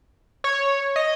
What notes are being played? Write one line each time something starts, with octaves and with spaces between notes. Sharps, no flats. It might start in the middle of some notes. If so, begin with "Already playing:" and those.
C#5
D#5